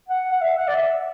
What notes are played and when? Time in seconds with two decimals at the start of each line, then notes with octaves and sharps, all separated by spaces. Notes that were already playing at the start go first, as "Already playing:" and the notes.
0.09 F#5
0.32 F#5
0.41 E5
0.57 F#5
0.67 D5
0.75 E5